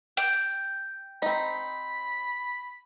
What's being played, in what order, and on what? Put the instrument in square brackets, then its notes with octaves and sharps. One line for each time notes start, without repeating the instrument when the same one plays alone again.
[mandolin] G5
[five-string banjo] C4 D#4 [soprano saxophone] B5